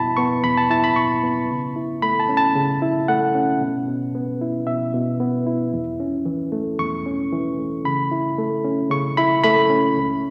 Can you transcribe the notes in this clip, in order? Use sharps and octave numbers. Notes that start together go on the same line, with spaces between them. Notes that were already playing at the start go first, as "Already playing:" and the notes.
Already playing: E2 B2 E4 A5 B5
B3 C#6
E2 B5
A5
E4 A5
B5
B2 C#6
B3
C#3
E4
A3 B5
A5
C#4
A5
C#3
E4
A3 F#5
C#4
B2
B2
B3
E4
B2 E5
B2
B3
E4
E2
C#4
E3
A3
E2 C#6
C#4
E3
A3
C#3 B5
E4
A3
C#4
C#3 C#6
E4 B5
A3 B5
C#4
C#2